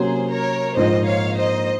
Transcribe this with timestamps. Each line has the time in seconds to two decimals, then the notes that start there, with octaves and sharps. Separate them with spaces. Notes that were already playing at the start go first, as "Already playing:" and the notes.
Already playing: C3 F#3 A#3 C#4 G#4 C5
0.31 A#4 C#5
0.76 A#1 G#2 F3 A#3 D#4 C5 D#5
1.06 C#5 F5
1.36 C5 D#5